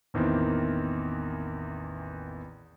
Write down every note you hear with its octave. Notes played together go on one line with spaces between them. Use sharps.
A1 E2 D#3 E3 A#3 C4